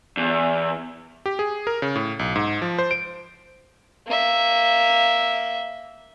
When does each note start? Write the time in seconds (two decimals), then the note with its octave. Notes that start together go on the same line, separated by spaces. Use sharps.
0.17 E2
1.26 G4
1.39 G#4
1.67 A#4
1.82 C#3
1.96 A2
2.19 B1
2.36 G#2
2.62 F3
2.79 C5
2.91 D7
4.07 A#3 E5